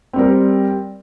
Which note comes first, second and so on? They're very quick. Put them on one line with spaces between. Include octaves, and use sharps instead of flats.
C4 G3 A#4